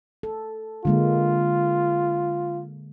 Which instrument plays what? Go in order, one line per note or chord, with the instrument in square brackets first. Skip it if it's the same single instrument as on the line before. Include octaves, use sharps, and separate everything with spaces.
[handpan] A4
[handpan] D3 G#3 A#3 [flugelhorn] F4